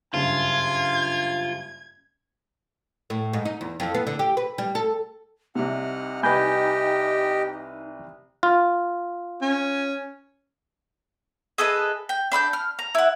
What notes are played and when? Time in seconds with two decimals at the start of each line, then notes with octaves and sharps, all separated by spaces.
0.14 F#1 G2 F4 G#6
3.10 A2
3.33 G#2
3.45 D#4
3.61 E2
3.80 F2
3.94 B3
4.07 D3
4.19 G4
4.37 B4
4.58 G3
4.75 A4
5.55 C2 C3 D#4 F#5 F6
6.23 C2 G4 B4 D#5 G5 G#5 B5 G6
8.43 F4
9.42 C#4
11.58 G#4 A4 B4 D#5
12.09 G5
12.32 D4 B5 E6 G6
12.53 F6
12.79 A#5
12.95 E4 F#5